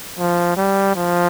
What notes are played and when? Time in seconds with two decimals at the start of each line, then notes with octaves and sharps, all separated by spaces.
0.19 F3
0.57 G3
0.95 F3